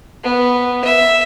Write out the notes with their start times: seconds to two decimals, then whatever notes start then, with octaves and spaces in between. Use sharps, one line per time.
0.23 B3
0.84 E5